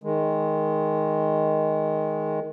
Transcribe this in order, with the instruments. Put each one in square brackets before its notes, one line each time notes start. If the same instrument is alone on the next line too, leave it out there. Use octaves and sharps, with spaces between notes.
[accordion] D#3 G#3